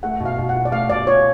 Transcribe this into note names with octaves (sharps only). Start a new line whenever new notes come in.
A3 F#5
B2
F5
B2
F#5
F4
D5
A3 F5
B2 D5
F4 C#5